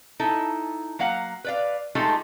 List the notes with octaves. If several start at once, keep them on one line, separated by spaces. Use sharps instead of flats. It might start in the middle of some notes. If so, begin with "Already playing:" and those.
D#4 E4 A4
F#3 A#3 F5 F#5
B4 D5 F5
G#3 A3 D#4 F4 G4 A4